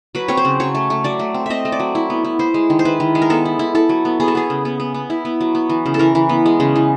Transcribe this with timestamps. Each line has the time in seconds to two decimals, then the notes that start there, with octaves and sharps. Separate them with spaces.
0.15 F#3 B4
0.28 C4 C#5
0.37 C5
0.45 C#3
0.60 F#3 C#5
0.75 A3
0.90 A3
1.04 F#3 D5
1.19 A3
1.34 C4
1.46 C4 D#5 E5
1.65 A3
1.72 D5
1.80 F#3
1.95 E4
2.10 B3
2.24 E4
2.39 E4 C5
2.54 G#3
2.70 D#3
2.79 C5
2.85 E4 B4
3.00 D#3
3.15 G#3
3.22 A#4
3.30 B3 A4
3.45 E4
3.59 E4
3.75 E4 A4
3.89 F#3
4.05 B3
4.20 B3 G#4
4.28 A4
4.35 B3 G#4
4.50 C#3
4.65 B3
4.80 B3
4.94 B3
5.10 E4
5.25 B3
5.41 F#3
5.55 B3
5.70 E3
5.86 C#3
5.94 A4
5.99 E3 A#4
6.15 E3
6.29 B3
6.46 G#3
6.60 C#3
6.76 E3